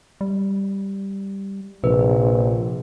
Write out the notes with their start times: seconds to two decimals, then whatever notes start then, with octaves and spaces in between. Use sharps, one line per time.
0.21 G3
1.84 A#1 C3 B4